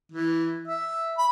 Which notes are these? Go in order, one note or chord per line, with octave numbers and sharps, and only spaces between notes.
E3
E5
B5